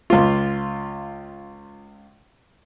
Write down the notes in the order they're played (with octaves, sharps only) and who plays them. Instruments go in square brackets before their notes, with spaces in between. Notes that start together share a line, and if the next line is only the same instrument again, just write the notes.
[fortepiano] C#2 F4